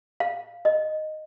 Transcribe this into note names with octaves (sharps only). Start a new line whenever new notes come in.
F5
D#5